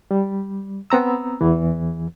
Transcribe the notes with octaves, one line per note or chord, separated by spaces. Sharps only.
G3
B3 C4 A#5 E6
E2 E3